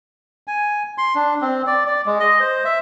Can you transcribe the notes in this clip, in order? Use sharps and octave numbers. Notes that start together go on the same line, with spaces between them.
G#5
C6
D4
C4
D5
D5
G#3
D#5
C5
E5